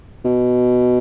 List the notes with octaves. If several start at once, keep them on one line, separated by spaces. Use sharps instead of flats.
B2